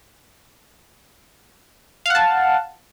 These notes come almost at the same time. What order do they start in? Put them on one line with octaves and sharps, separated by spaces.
F5 F#5 A5